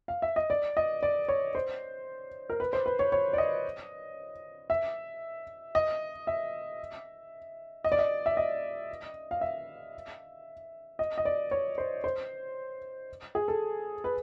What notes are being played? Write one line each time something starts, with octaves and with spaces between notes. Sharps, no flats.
F5
E5
D#5
D5
D#5
D5
C#5
C5
A#4
B4
C5
B4
C#5
C#5
D5
D#5
E5
D#5
E5
D#5
D5
D#5
E5
D#5
F5
E5
D#5
D#5
D5
C#5
C5
C5
G#4
A4
B4